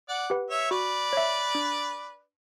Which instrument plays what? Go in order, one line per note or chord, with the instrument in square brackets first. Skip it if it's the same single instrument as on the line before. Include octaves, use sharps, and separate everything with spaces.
[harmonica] D5 F#5
[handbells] G4 B4 F#5
[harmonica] C#5 E5
[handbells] F#4 [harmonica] B4 D5
[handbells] C#5 E5
D4